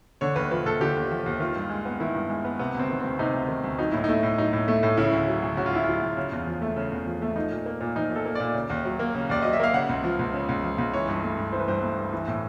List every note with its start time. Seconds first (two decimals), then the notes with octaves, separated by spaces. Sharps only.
0.21 D3 C#5
0.36 D#2 B4
0.51 F3 B4
0.66 D#2 A4
0.80 D3 G4
0.96 D#2
1.11 F3
1.26 D#2
1.40 D#3 F4
1.56 G2
1.70 G#3
1.85 B3
2.00 D#3 E4
2.15 G2
2.30 G#3
2.45 B3
2.59 C3 B3
2.74 D2
2.79 C4
2.90 D#3
3.00 D2 C4
3.19 C3 D#4
3.33 D2
3.48 D#3
3.64 D2
3.79 F#3 D#4
3.91 A2 E4
4.04 A3 D#4
4.23 A2
4.38 F#3 D#4
4.53 A2
4.68 A3
4.83 A2
4.97 C#3 E4
5.12 D2
5.28 F#3
5.42 D2
5.57 C#3 F#4
5.66 F4
5.72 D2 E4
5.84 F#3 F4
6.02 D2
6.17 C#3
6.32 E2
6.47 F3
6.61 A3
6.76 C#3
6.92 E2
7.06 F3
7.22 A3
7.36 F3 D#4
7.51 A#2
7.66 A#3
7.81 A#2
7.96 F3 D#4
8.10 A#2
8.16 A4
8.25 A#3
8.35 A#2 D5
8.55 C#3
8.70 D#2
8.85 F#3
8.99 A#3
9.15 C#3
9.30 D#2 D5
9.42 F#3 D#5
9.53 E5
9.60 A#3 F5
9.74 C#3 F#5
9.89 C#2
10.04 F3
10.19 C#2
10.33 C#3
10.49 C#2
10.63 F3
10.78 C#2
10.93 E3 C#5
11.08 G2
11.23 A3
11.38 G2
11.52 E3 C5
11.60 B4
11.68 G2 C5
11.83 A3
11.98 G2
12.13 E3
12.28 A2